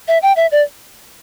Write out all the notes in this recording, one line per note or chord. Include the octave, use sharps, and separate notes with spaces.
E5
G5
E5
D5